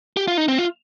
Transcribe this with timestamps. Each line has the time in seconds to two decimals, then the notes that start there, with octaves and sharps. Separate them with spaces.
0.17 G4
0.28 F4
0.37 D#4
0.48 C4
0.58 F4